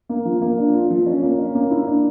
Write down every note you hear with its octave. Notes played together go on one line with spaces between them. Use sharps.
A#3
F3
A#3
D4
F4
F3
C#4
A#3
C#4
A#3
E4
D4